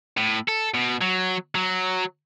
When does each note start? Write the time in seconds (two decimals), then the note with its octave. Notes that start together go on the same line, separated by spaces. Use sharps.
0.17 A2
0.49 A4
0.74 B2
1.01 F#3
1.55 F#3